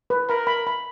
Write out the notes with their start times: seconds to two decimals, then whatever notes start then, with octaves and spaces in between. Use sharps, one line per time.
0.10 B4
0.29 A#4 B5
0.47 B5
0.67 B5